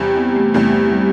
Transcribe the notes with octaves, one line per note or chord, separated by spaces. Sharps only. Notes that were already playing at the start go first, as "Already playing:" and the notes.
Already playing: E2 C3 G3
B3
A3
E2 C3 G3 A3
G3